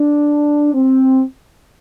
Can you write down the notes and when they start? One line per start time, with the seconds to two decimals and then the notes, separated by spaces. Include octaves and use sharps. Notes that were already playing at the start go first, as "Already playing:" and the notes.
Already playing: D4
0.74 C4